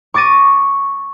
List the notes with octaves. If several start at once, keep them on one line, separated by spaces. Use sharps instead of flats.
C#6 D6 A6 A#6 D#7